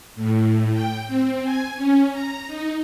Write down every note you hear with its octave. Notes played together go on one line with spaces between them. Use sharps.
A2
G5
C4
G#5
C#4
A#5
D#4